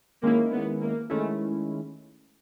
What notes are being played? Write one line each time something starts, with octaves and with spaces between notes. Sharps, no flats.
D#3 G#3 A#3 C#4 E4
B3
A#3
D#3 G#3 A3 C#4 E4